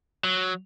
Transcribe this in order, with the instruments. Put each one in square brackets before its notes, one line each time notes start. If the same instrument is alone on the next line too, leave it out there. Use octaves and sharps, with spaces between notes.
[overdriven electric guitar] F#3